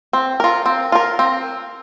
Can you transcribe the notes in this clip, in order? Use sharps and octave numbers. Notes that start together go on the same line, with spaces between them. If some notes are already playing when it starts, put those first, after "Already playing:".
C4
F4 A#4
C4
F4 A#4
C4